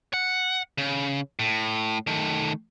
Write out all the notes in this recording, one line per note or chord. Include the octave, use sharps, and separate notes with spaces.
F#5
C#3
A2
D#3 A3